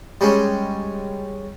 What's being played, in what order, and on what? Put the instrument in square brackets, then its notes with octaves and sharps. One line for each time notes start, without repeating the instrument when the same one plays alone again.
[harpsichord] G3 G#3 C#4